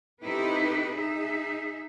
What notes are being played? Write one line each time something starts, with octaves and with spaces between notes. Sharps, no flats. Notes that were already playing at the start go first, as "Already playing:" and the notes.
C4 D#4 E4 G4 A4 B4
D#4 G#4 E5